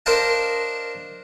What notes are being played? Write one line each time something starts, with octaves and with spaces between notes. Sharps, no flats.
D4 A#4 C5 D#5 F5 A5